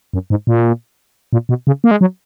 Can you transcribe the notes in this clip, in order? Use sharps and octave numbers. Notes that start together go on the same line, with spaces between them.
F#2
G#2
A#2
A#2
B2
C#3
A#3
G#3
F#3